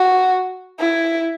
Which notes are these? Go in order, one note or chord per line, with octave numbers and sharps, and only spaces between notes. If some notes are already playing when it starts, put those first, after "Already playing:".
Already playing: F#4
E4